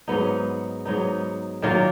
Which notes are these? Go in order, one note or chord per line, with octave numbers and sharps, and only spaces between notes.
G#2 F#3 B3 D#4
G#2 F#3 B3 D#4
D#3 F#3 A#3 F4